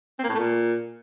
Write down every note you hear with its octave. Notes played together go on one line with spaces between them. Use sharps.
C4
A#3
A2
A3
A#2